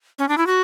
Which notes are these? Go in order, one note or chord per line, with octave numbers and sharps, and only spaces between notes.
C#4
D4
E4
F#4